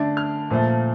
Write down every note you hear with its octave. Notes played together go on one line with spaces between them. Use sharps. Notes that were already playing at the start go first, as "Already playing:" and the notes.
Already playing: D3 A3 D4
F6
A#2 F3 A3